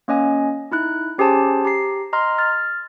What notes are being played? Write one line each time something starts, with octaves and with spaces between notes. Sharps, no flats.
A#3 C#4 D#5 G#5
D#4 E4 F#6
C#4 G4 G#4 C5 G#5 A5
G4 A#5 C7
D#5 A#5 C6 F6
F6 A6